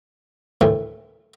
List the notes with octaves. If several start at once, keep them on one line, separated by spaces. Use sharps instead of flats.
D2 A2 D#3 E3 A3